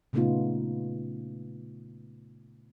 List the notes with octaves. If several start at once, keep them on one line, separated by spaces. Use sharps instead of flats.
A#2 C#3 A3 B3 D#4 F4